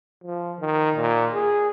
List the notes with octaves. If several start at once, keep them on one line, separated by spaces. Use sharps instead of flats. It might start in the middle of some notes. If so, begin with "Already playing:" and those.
F3
D#3
A#2
G#4